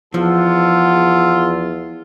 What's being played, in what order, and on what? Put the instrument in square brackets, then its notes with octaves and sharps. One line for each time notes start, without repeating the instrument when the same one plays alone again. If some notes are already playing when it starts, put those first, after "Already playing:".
[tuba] E2 [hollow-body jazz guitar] F3 [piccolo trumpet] F4 [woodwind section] F#5 A5 E6